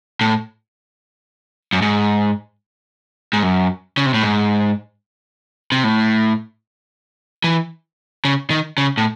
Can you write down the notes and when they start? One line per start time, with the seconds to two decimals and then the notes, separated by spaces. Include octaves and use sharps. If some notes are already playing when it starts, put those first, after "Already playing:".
0.21 A2
1.73 F#2
1.82 G#2
3.33 G#2
3.43 F#2
3.97 C#3
4.06 C3
4.14 A2
4.23 G#2
5.72 C3
5.84 A2
7.44 E3
8.25 C#3
8.50 D#3
8.78 C#3
8.97 A2